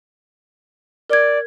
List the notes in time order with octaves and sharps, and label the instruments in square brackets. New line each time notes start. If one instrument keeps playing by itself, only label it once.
[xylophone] A#4 G#6 [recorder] D5